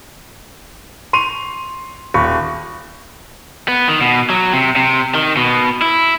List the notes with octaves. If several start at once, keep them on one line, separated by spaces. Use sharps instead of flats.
C6 C#6 D#7 F7
D#1 B5 C#6
B3
D#3
B2
F#3
C3
C3
D#3
B2
E4